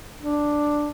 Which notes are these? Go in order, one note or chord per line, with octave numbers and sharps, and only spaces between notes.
D4